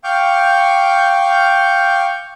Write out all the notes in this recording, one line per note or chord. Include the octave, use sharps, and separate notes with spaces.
F5 G5 C#6 D6 F6 G6